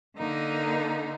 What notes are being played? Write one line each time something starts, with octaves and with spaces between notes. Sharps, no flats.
D3 A#3 D#4